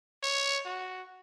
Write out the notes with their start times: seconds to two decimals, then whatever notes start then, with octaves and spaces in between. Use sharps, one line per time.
0.23 C#5
0.65 F#4